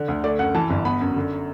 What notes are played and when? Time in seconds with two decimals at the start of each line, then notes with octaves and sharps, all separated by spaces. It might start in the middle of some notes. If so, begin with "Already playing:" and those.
Already playing: D3
0.08 D2
0.24 A3 D5
0.39 F#2 F#5
0.55 E3 A5
0.70 G1
0.85 B3 B5
1.01 F#2
1.16 D3